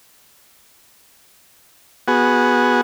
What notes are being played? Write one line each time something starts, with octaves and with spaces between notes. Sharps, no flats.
B3 F#4 G#4